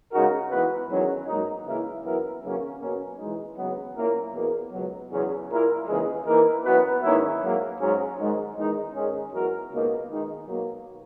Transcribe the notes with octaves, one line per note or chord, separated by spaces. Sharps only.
C#3 G#3 D#4 F#4 A#4
E3 B3 F#4 B4
E2 D#3 F#3 C#4
G#2 F#3 A#3 D#4
C#3 E3 A#3 E4 A#4
F#2 E3 B3 E4 A#4
D#2 C#3 F#3 A#3 C#4
B2 A#3 C#4
E3 G#3 D#4
D#2 C#3 F#3 B3
A#2 A#3 C#4 E4 A#4
E2 B2 A#3
C#2 B2 F#3
E2 C#3 F#3 C#4
A#2 A#3 E4 A#4
D#2 C#3 E3 G#3
E3 A#3 D#4 A#4
F#2 E3 B3 F#4 B4
G#2 D#3 A#3 C#4 E4
G#2 F#3 A#3
G#2 F#3 C#4
G#2 D#3 G#3
E2 D#3 G#3 D#4
G#2 D#3 G#3 C#4 G#4
F#2 E3 B3 F#4 A#4
C#2 B2 A#3 D#4
D#3 G#3 D#4
B2 F#3 A#3